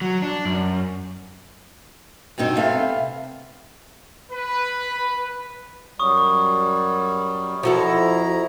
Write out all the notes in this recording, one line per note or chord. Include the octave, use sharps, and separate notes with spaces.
F#3
D4
F#2
G2 B2 C4 D#4
C3 A3 B3 F5
B4
F#2 F#3 G3 C#6 D#6
F2 F3 E4 F#4 A4 A#5